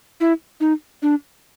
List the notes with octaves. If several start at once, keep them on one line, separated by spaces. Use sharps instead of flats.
E4
D#4
D4